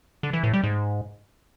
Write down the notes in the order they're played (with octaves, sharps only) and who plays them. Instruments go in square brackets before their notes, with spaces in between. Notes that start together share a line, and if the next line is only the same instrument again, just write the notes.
[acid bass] D3
E3
A2
G3
G#2